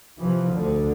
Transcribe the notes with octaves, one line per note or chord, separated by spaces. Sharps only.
C3 E3 F3
D2 D3